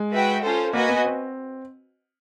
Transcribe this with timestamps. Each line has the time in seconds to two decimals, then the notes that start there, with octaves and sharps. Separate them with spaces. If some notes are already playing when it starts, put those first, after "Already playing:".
Already playing: G#3
0.11 F#4 B4 E5 G5
0.41 C#4 F4 A4 C5
0.72 A#3 F#4 B4 D#5 G#5
0.89 B3
1.04 C4